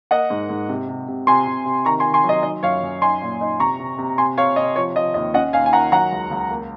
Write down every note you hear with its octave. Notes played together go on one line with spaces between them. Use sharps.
A#3 D#5 F#5
G#2
G#2
C3
C3
C3
C3 G#5 C6
C3
C3
D#3 A#5 C#6
G#5 C6
D#3
G#5 C6
F#3
D#5
D#4 D#5
F#2 C#5 F5
F#2
D#4 G#5 C6
A#2
D#4
C3 A#5 C#6
C3
C3
C3 G#5 C6
C3 C#5 F5
C3 D#5
F3 C#5
F3 D#5
D#2 D#5
C#4 D#5 F#5
D#2 F5 G#5
G#5
D#3 F#5 A#5
F#3 F#5 A#5
C#2
C#2
A#3